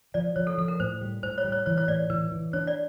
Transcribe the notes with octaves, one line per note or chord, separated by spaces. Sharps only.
F3 D5
F3 C#5
A4
F3 A4
A#4
A2 C5
G3
A2 C5
C#5
G3
C#5
E3 C#5
C#5
A2 D5
E3 B4
E3
D4 C#5
D5